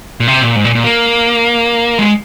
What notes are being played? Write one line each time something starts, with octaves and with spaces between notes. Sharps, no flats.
A#2
C3
A#2
G#2
A#2
A#2
A#3
G#3